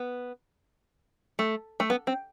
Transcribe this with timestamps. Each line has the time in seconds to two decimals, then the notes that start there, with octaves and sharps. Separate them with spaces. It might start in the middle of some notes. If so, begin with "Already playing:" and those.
Already playing: B3
1.39 A3
1.80 A3
1.90 B3
2.07 C4